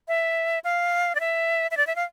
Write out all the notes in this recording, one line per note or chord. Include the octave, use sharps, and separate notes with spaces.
E5
F5
D5
E5
E5
D5
E5
F5